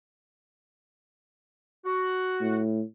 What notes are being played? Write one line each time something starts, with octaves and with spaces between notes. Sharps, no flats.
F#4
A2